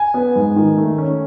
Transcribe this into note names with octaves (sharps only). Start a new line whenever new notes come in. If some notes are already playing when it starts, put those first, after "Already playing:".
Already playing: G#5
B3
G#2
D#3
A3
C#4